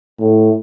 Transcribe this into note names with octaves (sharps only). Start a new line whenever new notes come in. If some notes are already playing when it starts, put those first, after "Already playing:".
A2